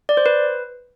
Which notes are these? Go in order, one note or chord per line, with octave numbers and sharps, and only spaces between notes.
D5
C5
B4